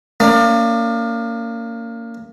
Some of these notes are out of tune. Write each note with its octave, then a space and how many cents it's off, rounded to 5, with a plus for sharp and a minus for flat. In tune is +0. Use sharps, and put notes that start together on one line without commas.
A#3 -25 C#4 +35 D5 +30